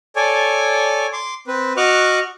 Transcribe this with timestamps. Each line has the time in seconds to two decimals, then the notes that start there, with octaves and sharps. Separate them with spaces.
0.16 A4 C#5 D5 G#5
1.13 C6 D6
1.47 C4 B4
1.77 F#4 D#5 C#6 D6 F6 F#6